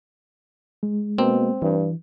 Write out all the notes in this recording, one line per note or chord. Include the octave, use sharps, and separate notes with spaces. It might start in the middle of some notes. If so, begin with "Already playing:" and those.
G#3
B2 A#3 C4
G2 E3